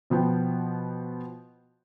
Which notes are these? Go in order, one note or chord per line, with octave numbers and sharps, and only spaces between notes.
B2 F3 B3 G5